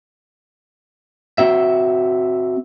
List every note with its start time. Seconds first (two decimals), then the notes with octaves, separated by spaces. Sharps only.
1.38 C4 F#4 E5